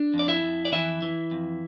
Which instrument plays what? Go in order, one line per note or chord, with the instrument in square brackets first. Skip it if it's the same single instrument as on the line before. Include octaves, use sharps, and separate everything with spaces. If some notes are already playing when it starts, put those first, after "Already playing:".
Already playing: [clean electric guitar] D4
F2
D5
E4 E5
F2
D5
E3 E4 E5
E3
F2